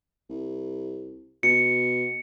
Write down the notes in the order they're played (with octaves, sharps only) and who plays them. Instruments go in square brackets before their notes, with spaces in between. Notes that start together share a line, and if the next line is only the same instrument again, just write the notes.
[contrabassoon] C2
[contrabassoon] B2 [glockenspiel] C#7